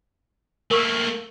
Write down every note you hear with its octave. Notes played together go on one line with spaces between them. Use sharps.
A3 A#3 A#4 C#6 E6